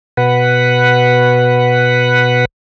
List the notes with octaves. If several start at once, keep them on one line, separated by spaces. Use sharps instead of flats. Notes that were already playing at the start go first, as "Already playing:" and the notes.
B2 B4 F#5